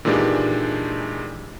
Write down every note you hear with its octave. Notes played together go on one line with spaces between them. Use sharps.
A#2 D#3 E3 G#3 D4 G4